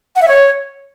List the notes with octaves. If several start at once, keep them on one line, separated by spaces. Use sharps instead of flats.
F#5
E5
C#5